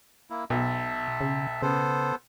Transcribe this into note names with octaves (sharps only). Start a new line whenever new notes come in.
A#3 E4
B1 B2 E5 A5
C#3
C#3 B3 A4 C5